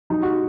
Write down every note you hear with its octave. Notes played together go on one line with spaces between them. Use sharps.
F#3 D#4
F#4